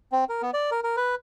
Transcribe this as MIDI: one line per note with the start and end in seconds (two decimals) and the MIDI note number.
0.12 0.24 60
0.29 0.42 70
0.42 0.51 59
0.54 0.70 74
0.71 0.80 70
0.84 0.96 70
0.97 1.15 71